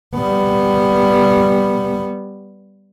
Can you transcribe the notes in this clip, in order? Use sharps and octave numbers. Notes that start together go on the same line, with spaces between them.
G3 B3